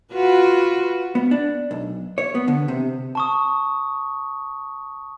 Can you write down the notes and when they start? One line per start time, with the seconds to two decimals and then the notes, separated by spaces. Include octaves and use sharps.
0.13 F4 F#4 B4
1.15 B3
1.31 D4
1.71 B1
2.18 C#5
2.35 B3
2.48 D3
2.68 C3
3.15 A5 C#6 D#6